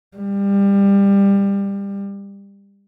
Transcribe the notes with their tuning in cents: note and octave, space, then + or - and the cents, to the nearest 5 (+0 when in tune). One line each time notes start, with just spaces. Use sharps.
G3 +25